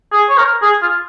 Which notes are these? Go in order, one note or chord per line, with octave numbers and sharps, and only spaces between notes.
G#4
C#5
A#4
G#4
F4